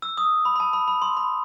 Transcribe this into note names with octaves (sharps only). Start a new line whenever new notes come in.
E6
D#6
B5
B5
A5
B5
B5
C6
B5